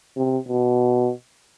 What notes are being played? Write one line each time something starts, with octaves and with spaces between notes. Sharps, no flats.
C3
B2